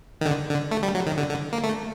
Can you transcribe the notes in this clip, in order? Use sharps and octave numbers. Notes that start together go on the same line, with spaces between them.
D#3
D3
D3
A3
G3
F#3
D#3
D3
D3
A#3
A3